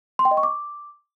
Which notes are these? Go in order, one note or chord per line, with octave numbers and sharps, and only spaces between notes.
C6
G5
D#5
C#6
D6